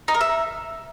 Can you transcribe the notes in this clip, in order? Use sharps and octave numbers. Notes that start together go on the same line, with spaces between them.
D#4
A#4
E5